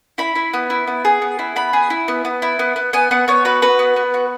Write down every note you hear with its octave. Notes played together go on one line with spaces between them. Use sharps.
E4 B5
E4
B3
E4
B3
G#4
B3
E4
B3 B5
G#4
E4
B3
B3
E4
B3
B3
B3 G#5
B3 F#5
B3 C#5
F#4 B4
F#4 B4
B3
B3
F#4